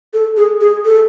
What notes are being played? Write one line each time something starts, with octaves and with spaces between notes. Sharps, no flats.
A4
G#4
G#4
A4